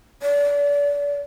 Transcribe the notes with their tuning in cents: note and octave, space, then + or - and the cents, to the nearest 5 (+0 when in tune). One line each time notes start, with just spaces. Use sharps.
D5 -35